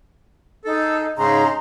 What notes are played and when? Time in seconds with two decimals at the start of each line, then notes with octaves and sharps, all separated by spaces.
0.65 D#4 G#4 A4
1.17 G#2 C#3 D#4 A#5 C6